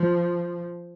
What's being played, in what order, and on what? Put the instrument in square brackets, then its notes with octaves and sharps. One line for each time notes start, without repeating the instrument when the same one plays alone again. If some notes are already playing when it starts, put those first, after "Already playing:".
Already playing: [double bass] F3